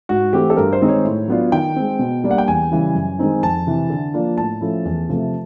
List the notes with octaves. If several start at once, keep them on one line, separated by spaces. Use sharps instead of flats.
G#2 F#4
E3 A3 C4 E4 G4
A4
G2 A#4
C5
D#3 G#3 C4 D#4
C#5
A2
F#3 B3 D4 F4
D#3 G5
G#3 C4
B2
G3 A#3 D4
F#5
G5
E2 G#5
C#3 E3 G3
F#2
D#3 G#3 C4 D#4
F2 A5
C3 E3
D3
F3 A#3 D4 F4
A2 A5
F3 A3 C#4 E4
E2
C3 F3 A3